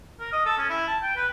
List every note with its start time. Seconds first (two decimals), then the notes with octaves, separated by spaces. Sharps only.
0.20 A#4
0.33 D#5
0.46 A4
0.57 C#4
0.70 E4
0.88 A5
1.02 G5
1.16 B4